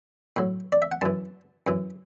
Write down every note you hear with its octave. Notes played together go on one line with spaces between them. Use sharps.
A2 F#3
D5
E5
F#5
F#2 E3 A5
F#2 E3